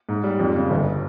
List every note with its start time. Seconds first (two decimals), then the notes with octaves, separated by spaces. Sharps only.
0.09 G#2
0.24 G3
0.39 F2
0.55 C#3
0.71 G1